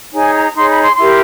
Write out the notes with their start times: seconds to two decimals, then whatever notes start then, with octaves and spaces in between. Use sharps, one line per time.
0.13 D#4 G#4 C#5 G#5
0.33 A#5
0.54 D#4 G#4 C#5 C6
0.68 B5
0.82 C6
0.96 E4 G4 A#4 C6